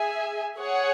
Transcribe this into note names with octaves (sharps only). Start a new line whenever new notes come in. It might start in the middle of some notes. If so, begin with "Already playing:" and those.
Already playing: G#4 E5 G#5
G#4 C#5 F#5